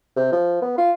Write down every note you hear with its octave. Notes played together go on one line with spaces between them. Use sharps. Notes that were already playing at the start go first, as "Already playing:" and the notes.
C3
F3
B3
F4